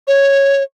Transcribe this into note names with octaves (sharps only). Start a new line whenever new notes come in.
C#5